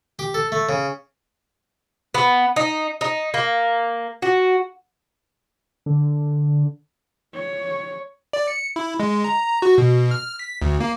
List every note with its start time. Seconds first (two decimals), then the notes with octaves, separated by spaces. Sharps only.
0.19 G4
0.34 A4
0.52 A3
0.69 C#3
2.14 B3
2.56 D#4
3.01 D#4
3.34 A#3
4.22 F#4
5.86 D3
7.34 C#5
8.33 D5
8.48 C#7
8.76 E4
9.00 G#3
9.24 A#5
9.62 F#4
9.78 B2
10.11 F6
10.39 B6
10.62 D2
10.80 A#3